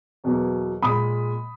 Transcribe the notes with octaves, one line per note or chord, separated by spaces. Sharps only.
E2 B2 F#3 A#3
A#2 G#3 B5 D#6